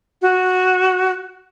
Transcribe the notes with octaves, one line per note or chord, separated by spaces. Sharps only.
F#4